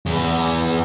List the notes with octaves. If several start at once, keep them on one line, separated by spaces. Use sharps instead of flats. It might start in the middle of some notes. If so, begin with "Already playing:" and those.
E2